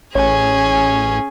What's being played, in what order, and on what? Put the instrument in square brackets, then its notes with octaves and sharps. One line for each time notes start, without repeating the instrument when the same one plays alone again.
[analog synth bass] A1 [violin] C#4 G#4 [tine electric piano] C#5 [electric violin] G#5